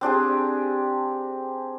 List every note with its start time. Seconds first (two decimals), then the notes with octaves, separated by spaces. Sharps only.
0.01 C4 D4 G4 G#4